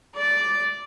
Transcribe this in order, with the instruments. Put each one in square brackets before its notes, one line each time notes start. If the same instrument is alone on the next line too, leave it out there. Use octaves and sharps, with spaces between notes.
[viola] D5